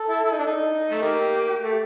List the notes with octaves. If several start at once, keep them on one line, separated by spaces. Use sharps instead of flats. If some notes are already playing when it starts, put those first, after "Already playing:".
Already playing: A4
E4
E4
D#4
D4
D#4
A3
D#3 A#3 G4
A3